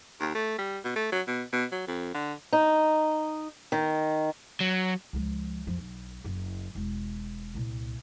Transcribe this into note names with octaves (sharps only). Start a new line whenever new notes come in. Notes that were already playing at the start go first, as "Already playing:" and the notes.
D#2
A3
G3
B2
A3
F#3
B2
B2
F#3
F2
D3
D#4
D#3
F#3
C#2 F3
F2 F3
B1
F#1 B3
E1
C2 A#2